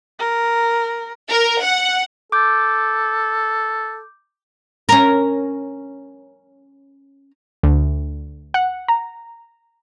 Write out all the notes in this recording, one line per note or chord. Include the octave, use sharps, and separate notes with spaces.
A#4
A#4
F#5
A4 D6 G6
C#4 A#4
D2
F#5
A#5